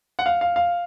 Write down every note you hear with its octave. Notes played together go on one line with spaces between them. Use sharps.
F#5
F5
F5
F5